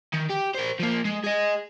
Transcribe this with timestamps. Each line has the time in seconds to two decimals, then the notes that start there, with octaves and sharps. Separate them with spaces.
0.13 D#3
0.29 G4
0.54 A#4 C5
0.80 F3 A#3
1.05 G#3
1.24 G#4 D#5